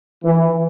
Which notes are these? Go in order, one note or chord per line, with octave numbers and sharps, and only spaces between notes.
E3